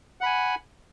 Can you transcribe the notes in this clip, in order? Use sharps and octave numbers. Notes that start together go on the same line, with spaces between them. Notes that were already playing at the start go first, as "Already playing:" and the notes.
F#5 G#5 B5